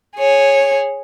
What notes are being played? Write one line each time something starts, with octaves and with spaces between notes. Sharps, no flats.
G#4 C#5